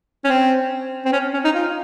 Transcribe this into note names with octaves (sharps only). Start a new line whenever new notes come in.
C#4
C4
C4
C#4
C#4
D#4
F4